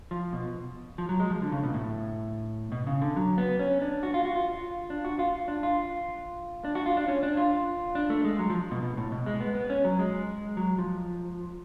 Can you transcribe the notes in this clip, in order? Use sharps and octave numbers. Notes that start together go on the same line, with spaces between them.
F3
B2
F3
F#3
G#3
F3
D3
C#3
B2
A2
B2
C#3
D3
F#3
B3
C#4
D4
F#4
F4
F#4
F4
D4
F#4
F4
D4
F4
D4
F#4
F4
D4
C#4
D4
F4
D4
A3
G#3
F#3
F3
B2
B2
A2
B2
G#3
B3
B3
C#4
F#3
G#3
F#3
F3